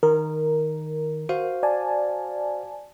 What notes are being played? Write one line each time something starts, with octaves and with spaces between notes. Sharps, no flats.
D#3 A#4
F#4 C5 F5
D5 G#5 A5